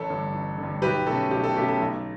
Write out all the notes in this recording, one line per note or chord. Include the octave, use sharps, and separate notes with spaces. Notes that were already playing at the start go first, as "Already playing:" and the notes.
Already playing: A1 A4 C#5
G2 D3
A1
D3
G2
B1 G4 B4
B2 A3 C#4 A4
B1 G4
A4
B2 A3 C#4 G4
A4
B1